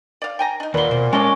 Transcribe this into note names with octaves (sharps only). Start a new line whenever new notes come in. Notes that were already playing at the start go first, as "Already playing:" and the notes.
D5 F5
G5 G#5 A#5
D4 D#4
D#2 A#2 B4 F#5 C6
B2 C5
G#3 C#4 F4 A4 D#5 D6